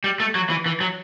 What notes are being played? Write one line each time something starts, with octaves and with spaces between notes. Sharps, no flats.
G3
A3
F#3
E3
E3
F#3